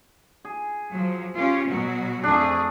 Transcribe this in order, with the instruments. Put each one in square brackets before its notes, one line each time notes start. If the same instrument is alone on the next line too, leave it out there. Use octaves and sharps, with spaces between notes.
[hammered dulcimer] G#4
[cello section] F3 F#3
C#4 F4 G4
B2 F#3 F#4
[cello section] F2 G#4 [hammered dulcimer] A3 D4